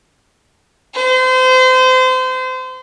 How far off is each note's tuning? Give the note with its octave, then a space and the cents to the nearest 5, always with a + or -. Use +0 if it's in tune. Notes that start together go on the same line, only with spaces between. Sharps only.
C5 -30